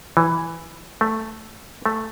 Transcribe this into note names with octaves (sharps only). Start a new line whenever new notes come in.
E3
A3
A3